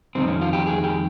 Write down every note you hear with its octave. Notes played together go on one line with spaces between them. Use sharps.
F2 D#3 G3 C4
C#4
F4
G4
G#4
G4